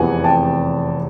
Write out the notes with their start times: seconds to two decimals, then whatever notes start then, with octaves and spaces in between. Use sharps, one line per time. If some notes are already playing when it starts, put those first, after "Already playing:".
Already playing: F1 E2 C3 E3 F#5 G#5
0.24 G5 A5